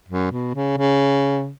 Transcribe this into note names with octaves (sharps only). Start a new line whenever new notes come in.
F#2
B2
C#3
C#3